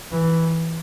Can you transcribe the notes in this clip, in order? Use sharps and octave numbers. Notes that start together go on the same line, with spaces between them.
E3